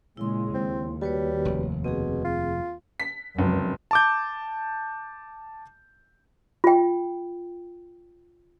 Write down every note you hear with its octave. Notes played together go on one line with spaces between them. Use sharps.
A#2 C#3 G#3 E4 C6
D#2 C4
G3 F#4 B4 C#5
F1
B2 C4 G#4
F4
B6
F1 C#2 F#2
A5 D6 G6
F4 G5